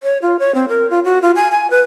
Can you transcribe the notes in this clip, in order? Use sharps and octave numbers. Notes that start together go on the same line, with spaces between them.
C#5
F4
C#5
C4
A#4
F4
F#4
F4
G#5
G#5
B4